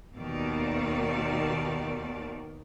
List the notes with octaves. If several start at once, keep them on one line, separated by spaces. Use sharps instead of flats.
D#2 B2 D#3 D5